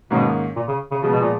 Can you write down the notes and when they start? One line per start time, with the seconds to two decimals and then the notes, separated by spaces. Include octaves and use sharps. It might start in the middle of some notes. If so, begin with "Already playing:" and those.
0.11 G#2 B2 D#3 A#3 C#4
0.56 A#2
0.68 C#3
0.91 C#3
1.02 C#3 F3 G#3 B3
1.11 B2
1.20 A#2